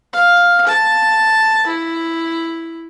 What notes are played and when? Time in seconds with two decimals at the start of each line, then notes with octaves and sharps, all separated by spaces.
0.13 F5
0.67 A5
1.67 E4